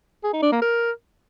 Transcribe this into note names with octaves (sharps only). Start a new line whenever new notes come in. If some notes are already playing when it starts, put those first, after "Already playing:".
G#4
D#4
D4
A#3
A#4